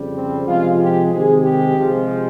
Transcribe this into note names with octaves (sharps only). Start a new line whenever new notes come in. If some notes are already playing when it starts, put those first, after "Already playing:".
Already playing: F2 C#3 G3
C4
C3 F3 G#3 F4
G4
C3 D#3 G#3 G#4
G4
C3 F3 G#3